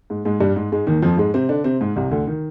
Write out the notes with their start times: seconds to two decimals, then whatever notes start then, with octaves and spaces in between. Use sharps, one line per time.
0.10 G#2 G#3
0.25 G#2 G#3
0.40 G2 G3
0.56 G#2 G#3
0.72 G#2 G#3
0.87 D#2 D#3
1.02 F2 F3
1.18 G#2 G#3
1.34 C3 C4
1.49 D3 D4
1.64 C3 C4
1.81 G#2 G#3
1.96 C2 C3
2.11 D2 D3
2.27 D#3